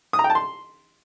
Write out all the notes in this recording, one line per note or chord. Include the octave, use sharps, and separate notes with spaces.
D#6
A#5
G5
A5
C6